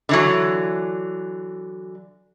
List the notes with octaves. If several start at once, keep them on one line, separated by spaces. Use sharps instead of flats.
D3 E3 F#3